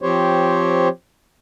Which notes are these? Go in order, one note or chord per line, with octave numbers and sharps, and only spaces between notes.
F3 C4 G4 C5 C#5